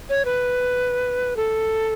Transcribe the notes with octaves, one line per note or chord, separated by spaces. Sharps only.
C#5
B4
A4